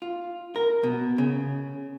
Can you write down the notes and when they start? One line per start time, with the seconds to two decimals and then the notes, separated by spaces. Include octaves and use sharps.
0.02 F4
0.56 A#4
0.84 B2
1.18 C#3